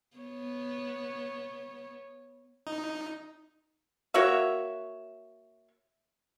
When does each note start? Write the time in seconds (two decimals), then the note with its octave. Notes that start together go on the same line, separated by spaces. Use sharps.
0.17 B3 C#5
2.67 D#4
4.14 A#3 F#4 C#5 E5